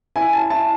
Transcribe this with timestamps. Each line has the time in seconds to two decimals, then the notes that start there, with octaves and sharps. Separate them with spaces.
0.16 E4 G#5
0.33 A5
0.50 E4 A5